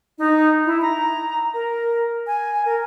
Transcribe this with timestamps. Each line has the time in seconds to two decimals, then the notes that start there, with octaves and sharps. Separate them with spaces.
0.18 D#4
0.66 E4
0.82 A#5
1.54 A#4
2.27 G#5
2.65 A#4